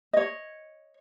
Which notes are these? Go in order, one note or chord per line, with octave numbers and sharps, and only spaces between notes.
C#5 D#5